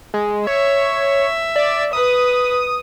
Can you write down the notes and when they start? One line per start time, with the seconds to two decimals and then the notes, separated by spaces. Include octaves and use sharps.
0.14 G#3
0.47 C#5 E5
1.56 D5
1.93 B4 D#6